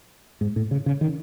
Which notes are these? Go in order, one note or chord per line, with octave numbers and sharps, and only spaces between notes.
G#2
A2
C#3
C#3
D#3